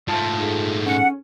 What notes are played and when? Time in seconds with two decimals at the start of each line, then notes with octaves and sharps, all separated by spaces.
0.08 G#2 A3 F4 A5
0.37 D#4 G#4 A4
0.86 C#4 F#5